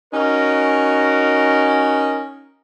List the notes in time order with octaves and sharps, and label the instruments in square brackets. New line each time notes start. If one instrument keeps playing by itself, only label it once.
[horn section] C#4 D#4 F#4 A#4